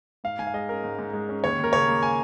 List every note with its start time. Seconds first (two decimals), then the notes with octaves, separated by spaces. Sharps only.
0.24 G#2 F5
0.39 G#2 G#5
0.47 F5
0.54 G#3 D#5
0.69 C#4 A#4
0.84 G#2
0.99 G#2
1.13 G#3
1.29 C#4
1.43 D#2 C#5
1.58 D#2
1.64 A#4
1.73 C#3 C#5
1.88 A#3
2.03 G#5